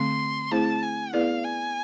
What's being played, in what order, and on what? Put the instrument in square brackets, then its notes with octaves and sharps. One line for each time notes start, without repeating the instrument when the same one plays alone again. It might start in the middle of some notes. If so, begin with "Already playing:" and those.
Already playing: [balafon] D3 A3 C4 [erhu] C6
[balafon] A3 C4 E4 G#4 C5 [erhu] A5
[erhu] G#5
[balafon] B3 E4 G#4 B4 D5 [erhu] F5
[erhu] G#5